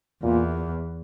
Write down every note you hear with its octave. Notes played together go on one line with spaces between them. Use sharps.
E2 A#2